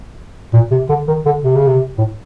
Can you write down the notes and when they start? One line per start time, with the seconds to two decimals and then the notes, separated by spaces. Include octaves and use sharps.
0.54 A#2
0.71 C3
0.89 D3
1.08 D#3
1.26 D3
1.44 C3
1.56 C#3
1.67 C3
1.98 A2